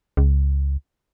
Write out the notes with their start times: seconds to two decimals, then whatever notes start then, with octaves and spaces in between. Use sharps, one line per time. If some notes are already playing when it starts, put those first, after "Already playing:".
0.17 C#2